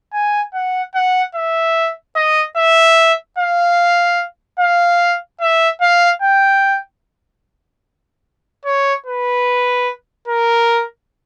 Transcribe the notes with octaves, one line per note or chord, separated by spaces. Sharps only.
G#5
F#5
F#5
E5
D#5
E5
F5
F5
E5
F5
G5
C#5
B4
A#4